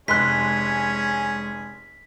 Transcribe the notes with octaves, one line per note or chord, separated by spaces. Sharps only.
F1 G#3 C#4 G#4 C6 F#6 B6